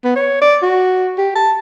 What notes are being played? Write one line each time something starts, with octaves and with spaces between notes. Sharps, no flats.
B3
C#5
D5
F#4
G4
A5